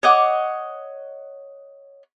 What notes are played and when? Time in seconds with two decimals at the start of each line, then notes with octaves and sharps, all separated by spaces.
0.03 C#5 D#5 F#5 D6